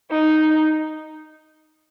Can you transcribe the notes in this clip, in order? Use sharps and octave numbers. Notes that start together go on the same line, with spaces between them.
D#4